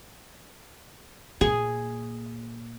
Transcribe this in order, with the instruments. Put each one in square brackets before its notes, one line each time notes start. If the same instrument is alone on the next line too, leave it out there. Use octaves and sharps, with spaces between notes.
[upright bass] A#2 [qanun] G#4